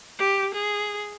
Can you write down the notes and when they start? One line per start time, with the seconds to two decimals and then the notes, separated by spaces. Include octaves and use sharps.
0.19 G4
0.54 G#4